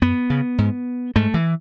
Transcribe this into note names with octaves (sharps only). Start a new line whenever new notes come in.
F#2 B3
C#3
G#2
G#2 A3
E3